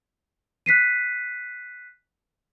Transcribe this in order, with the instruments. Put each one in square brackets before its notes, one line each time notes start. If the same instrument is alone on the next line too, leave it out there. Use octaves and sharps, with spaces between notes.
[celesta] F#6 B6 C7 D#7